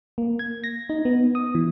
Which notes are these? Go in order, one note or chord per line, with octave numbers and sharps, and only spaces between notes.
A#3
G#6
A#6
D#4
B3
D#6
E3